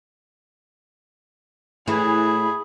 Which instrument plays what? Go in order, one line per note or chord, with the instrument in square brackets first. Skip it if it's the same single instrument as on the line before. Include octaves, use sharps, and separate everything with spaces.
[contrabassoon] A2 [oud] E3 [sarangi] G#4 [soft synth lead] B5